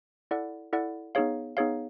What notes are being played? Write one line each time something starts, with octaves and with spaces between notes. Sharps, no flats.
E4 A4 D5 F#5
E4 A4 D5 F#5
B3 D#4 G#4 C#5 F5
B3 D#4 G#4 C#5 F5